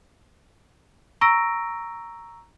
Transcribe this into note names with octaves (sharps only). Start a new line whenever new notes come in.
A#5 C#6 E6 A#6 D7